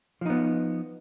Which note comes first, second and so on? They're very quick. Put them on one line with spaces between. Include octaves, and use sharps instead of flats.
F3 D#4 B3